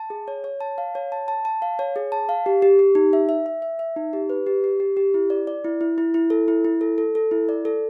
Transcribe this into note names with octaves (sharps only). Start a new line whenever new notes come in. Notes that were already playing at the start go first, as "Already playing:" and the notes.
Already playing: A5
G#4
C#5
C#5
A5
F5
C#5
A5
A5
A5
F5
C#5
G#4
A5
F5
G4
G4
G4
D#4
E5
E5
E5
E5
E5
D#4
G4
B4
G4
G4
G4
G4
E4
D5
D5
E4
E4
E4
E4
A4
E4
E4
A4
A4
A4
E4
D5
A4